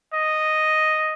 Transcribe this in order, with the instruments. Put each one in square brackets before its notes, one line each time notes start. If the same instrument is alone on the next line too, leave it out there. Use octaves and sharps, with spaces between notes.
[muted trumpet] D#5